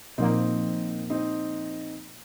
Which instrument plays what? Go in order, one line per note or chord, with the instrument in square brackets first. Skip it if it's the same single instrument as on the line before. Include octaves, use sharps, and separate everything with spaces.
[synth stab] A#2 F3 A#3 [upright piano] C4 D#4
[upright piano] C4 D#4